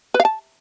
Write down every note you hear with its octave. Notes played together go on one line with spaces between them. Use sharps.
B4
F5
A5